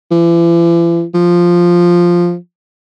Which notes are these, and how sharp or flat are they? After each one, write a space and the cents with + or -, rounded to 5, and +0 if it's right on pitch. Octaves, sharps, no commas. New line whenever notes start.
E3 +45
F3 +0